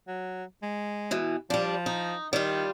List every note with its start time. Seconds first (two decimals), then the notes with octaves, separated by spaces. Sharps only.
0.08 F#3
0.63 G#3
1.11 B2 E3
1.50 F3 G3 D4
1.86 D#4
2.33 D#3 G3 F4